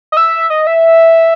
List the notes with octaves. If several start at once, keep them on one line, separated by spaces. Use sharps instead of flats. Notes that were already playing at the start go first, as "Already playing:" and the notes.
D#5
E5
D#5
E5